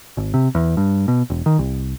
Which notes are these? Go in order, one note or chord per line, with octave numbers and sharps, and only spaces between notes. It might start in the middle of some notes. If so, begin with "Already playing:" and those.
G#1
C3
E2
G2
B2
E1
D#3
C2